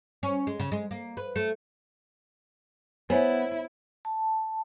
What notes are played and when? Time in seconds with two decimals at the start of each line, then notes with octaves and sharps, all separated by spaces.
0.23 C#4
0.47 G#3
0.60 C#3
0.72 G#3
0.91 A#3
1.17 B4
1.36 A3
3.10 B3 E4 C5 C#5 G#5
4.05 A5